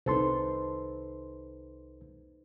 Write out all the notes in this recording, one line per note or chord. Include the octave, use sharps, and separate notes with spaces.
C2 D#4 A4 B4 C5 C6